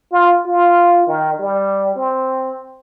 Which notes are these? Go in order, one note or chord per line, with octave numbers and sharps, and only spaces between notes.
F4
F4
D#3
G3
C4